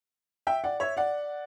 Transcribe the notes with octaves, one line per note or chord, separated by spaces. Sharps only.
E5 G5
D5 F#5
C#5 E5
D5 F#5